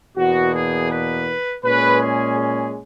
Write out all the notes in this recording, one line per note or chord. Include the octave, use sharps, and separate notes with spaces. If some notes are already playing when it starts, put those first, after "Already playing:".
E2 B2 A#3 F#4
G#4
B4
A#2 G#3 C#4 B4
G#4
G#4